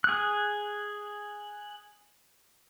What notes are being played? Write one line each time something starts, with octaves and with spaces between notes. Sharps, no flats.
G#4 F#6